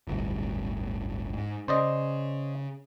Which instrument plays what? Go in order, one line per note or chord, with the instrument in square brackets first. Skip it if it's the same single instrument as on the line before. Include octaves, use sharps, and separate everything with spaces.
[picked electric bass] D1 G1 C2
G#2
[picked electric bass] C#3 [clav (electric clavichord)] C5 D5 D#5